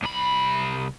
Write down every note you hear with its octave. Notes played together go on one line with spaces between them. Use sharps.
C2 B5